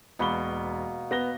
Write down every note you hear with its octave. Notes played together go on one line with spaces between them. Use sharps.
E1 B2 A#3 B5 C#6 G7
B3 A#6 G7